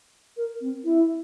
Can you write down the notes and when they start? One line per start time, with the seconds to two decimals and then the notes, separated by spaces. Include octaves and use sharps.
0.37 A#4
0.61 C4
0.84 E4